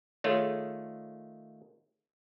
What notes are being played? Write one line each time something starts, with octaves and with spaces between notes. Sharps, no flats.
D#3 A3 F4 G#4 A4 C#5